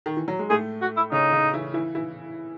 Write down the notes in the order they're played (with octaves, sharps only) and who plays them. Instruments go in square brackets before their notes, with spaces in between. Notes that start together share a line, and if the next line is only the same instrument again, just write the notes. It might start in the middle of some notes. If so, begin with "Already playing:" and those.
[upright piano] D#3
E3
F#3
G#3
[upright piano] A2 A3 [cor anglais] G#4
[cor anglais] F#4
E4
[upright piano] C#3 C#4 [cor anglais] D#4
[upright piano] C#3 C#4
E3 E4
E3 E4
E3 E4